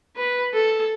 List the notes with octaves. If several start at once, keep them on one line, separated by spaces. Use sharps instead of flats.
B4
A4